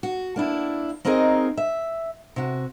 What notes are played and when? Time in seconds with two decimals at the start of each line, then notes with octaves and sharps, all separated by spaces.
0.03 F#4
0.36 A#3 D4 E4
1.05 A#3 C4 D#4 G#4 A#4 D#5
1.57 E5
2.36 C3 F#4